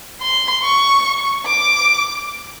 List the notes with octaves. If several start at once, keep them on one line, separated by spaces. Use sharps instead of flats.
C6
C#6
D6